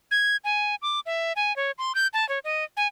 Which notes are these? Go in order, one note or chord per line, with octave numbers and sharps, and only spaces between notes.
G#6
G#5
D6
E5
G#5
C#5
C6
G6
A5
C#5
D#5
G#5